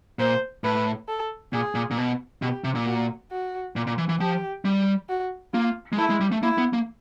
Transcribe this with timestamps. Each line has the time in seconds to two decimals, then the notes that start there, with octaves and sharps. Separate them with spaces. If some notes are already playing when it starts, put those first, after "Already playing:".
0.19 A#2 C5
0.64 A2 B4
1.09 A4
1.53 A#2 G#4
1.75 A#2
1.91 A#2
1.98 B2
2.42 B2 G4
2.64 C3
2.75 A#2
2.87 F#4
3.31 F#4
3.76 A#2
3.87 A#2
3.98 E3
4.09 E3
4.20 F3 G4
4.65 G3
5.09 F#4
5.53 A#3 F4
5.93 G#3
5.98 A3 E4
6.10 G#3
6.21 G3
6.32 A3
6.43 A#3 E4
6.58 B3
6.73 A#3